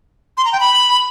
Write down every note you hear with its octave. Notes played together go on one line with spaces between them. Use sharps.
C6
A#5
G5
B5